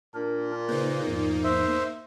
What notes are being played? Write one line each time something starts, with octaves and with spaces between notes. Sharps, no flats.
A#2 D4 A#4
C#3 A#3 D#4 B4 C5
E2 G#2 F3
C5 E5